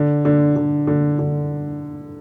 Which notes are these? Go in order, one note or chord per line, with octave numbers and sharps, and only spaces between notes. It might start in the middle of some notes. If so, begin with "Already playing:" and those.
Already playing: D3
D3
D3
D3
D3